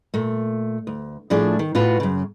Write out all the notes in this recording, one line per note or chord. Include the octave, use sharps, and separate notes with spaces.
A#2 A3
D2
A2 F3 A3 D4 G#4 D5
D#3
A2 F4 F#4 B4
F#2 C#3